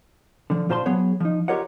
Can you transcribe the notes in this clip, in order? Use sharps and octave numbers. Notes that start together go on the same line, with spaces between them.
D3 F3
A#2 F4 C5 A5 A#5 C6
F#3 B3 G#4 C#5
F3 D#4
F4 G4 A#4 C#5 D#5 F#5